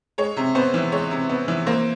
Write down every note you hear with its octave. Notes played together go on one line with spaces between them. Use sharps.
G#3 C#5
C3
B3 C5
E3
G#3 C#5
C3
B3
E3
A#3 C5